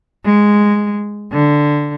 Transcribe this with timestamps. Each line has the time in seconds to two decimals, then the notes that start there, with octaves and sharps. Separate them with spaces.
0.25 G#3
1.32 D3